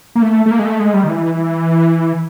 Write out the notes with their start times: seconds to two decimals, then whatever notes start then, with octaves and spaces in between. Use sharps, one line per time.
0.15 A#3
0.22 A3
0.46 A3
0.51 A#3
0.59 G#3
0.65 A3
0.80 G#3
0.94 G3
1.04 D#3
1.09 E3